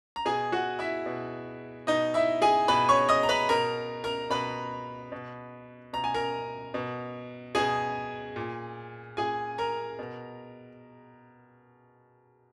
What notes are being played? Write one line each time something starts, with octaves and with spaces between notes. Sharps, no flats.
A#5
B2 G#4 G#5
F#4 F#5
E4 E5
B2
B2 D#4 D#5
E4 E5
G#4 G#5
B2 B4 B5
C#5 C#6
D#5 D#6
A#5
B4 B5
B2 A#4 A#5
A#4 A#5
B2 B4 B5
B2
B2 A#5
G#5
A#4 A#5
B2
B2 G#4 G#5
A#2
A#2 G#4 G#5
A#4 A#5
B2